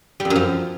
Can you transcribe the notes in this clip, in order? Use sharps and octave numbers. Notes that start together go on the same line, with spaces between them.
G3
F2
F#2
F3